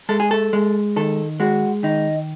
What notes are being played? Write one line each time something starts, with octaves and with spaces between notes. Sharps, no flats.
G#3 A4
G#4
A4
G#3
D#3 A4
G#3 F#4
D#3 D#4